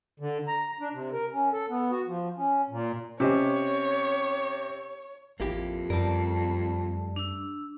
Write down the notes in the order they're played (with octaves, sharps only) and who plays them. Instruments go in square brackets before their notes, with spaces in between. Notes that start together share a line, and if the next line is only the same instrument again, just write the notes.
[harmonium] D3
A#5
D4
C3
A#4
C#4
A4
B3
F#4
F3
C#4
A#2
[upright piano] C3 [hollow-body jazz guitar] C#4 C5 D#5 [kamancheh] C#5
[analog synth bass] A1 [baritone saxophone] F2 [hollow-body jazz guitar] A#3 E4 G4
[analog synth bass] F#2 [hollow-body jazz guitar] G3 A3 A#4 [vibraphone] D5 A5
[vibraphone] D4 E6